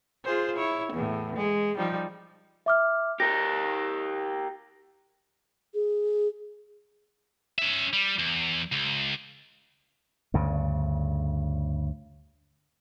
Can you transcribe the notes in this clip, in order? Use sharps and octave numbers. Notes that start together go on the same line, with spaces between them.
F4 G#4 C5
E4 C#5
E2 A2
G#3
F3 G3 D#4
E5 D6 F6
G4 A#4 A#6
G#4
C#4 E5
G3
E2
C#2
D2 G2 C#3